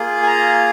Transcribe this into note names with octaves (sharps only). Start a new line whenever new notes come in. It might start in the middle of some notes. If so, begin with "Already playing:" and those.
Already playing: A#3 F4 G#4
G#5
A#5